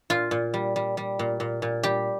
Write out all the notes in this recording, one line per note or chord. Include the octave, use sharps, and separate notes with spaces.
A#2 F4
A#2
G3
G3
G3
A#2
A#2
A#2
G3 G4